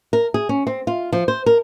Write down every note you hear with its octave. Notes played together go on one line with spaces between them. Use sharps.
A#4
G#4
C#4
C4
F4
F3
C5
A#4